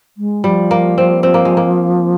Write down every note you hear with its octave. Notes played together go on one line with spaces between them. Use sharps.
G#3
F3 G3
A#3
C4
C4
A#3
G#3
A#3